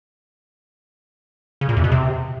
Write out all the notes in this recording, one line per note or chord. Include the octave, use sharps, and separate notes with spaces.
C#3
A#2
E2
B2
C3